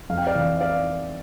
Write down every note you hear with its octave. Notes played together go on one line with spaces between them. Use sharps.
F2 F5
G5
D5 F5
E3
E5
D5 F5